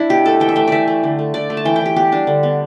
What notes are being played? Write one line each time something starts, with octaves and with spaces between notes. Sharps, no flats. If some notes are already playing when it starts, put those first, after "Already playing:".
Already playing: D4 E4
B2 G4
A3 A4
E3 G5
E5
A3 G5
E3 D5 E5
A3
D3
A3
D3 D5
A3
A5
E3 G5
G5
E3 G4
B3 G4
G3 D4
D3
B3